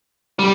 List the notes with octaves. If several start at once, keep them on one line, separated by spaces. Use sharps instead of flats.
G3